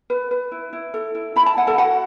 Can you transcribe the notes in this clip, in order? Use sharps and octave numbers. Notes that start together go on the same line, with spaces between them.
B4
B4
E4
E4
A4
E4
E4 B5
A5
E4 F#5
A4 A5
E4 F#4 F#5